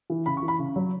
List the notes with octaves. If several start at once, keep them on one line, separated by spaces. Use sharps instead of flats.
E3
C#3 B5
C#6
E3
B5
C#3
F#3